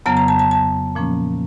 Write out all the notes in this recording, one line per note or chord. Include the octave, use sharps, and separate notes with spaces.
F2 C#3 F#3 B3 A#5
A#5
A5
A5
A5
A#2 F3 A#3 C#4